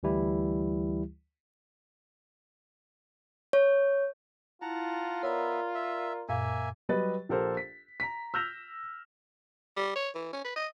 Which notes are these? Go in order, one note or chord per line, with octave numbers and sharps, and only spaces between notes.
D2 E3 G3 E4 G4
C#5
E4 F4 F#5 A5 A#5
B3 A#4 C#5 D5 E5 A#5
E5
F#2 A#2 A#3 E5 F5 G#5
F#3 G3 G4 B4 D#5 A6
A#1 G4 A4 A#4 C5
B6
A#5 B6
E6 F6 G6 A#6 F7
G3
C#5
E3
C#4
B4
D#5